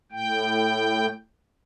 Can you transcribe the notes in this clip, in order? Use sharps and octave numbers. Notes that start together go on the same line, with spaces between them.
A2 G5